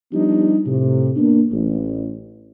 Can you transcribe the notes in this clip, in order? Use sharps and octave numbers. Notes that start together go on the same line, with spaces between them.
F3 G3 B3 D4 D#4 G4
A2 C3
A#3 B3 D4
A1